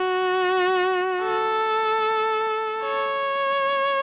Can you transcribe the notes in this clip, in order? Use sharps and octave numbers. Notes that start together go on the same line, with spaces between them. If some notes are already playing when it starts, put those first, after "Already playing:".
Already playing: F#4
A4
C#5